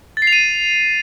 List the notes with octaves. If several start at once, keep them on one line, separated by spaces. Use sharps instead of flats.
A6
C7
F7
D#7